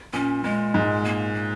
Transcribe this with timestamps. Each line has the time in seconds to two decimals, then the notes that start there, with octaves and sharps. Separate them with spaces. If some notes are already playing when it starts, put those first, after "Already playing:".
0.13 A#2 C#4
0.44 A#2 G#3
0.74 G#2
1.05 A#3
1.35 A#3